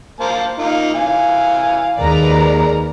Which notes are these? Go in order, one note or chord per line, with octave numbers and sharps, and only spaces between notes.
A#3 C5 A5
A#3 D#4 F4
E3 F5 G#5
D#2 G#3 A#4 B4 D5 A#5